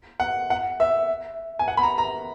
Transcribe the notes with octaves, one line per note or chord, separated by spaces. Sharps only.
F#5
F#5
E5
G#5
F#5
B5
A#5
A#5